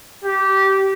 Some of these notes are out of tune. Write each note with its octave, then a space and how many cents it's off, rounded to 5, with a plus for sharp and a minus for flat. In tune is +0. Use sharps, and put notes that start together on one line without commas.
G4 -20